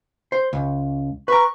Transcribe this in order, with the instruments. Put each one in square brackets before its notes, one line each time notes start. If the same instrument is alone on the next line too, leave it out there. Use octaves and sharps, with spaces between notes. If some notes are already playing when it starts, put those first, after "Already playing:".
[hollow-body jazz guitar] C5
C#2
[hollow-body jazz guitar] B4 A#5 [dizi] C#6